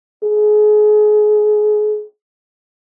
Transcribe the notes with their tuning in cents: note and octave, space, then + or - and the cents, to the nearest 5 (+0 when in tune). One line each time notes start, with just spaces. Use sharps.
G#4 +30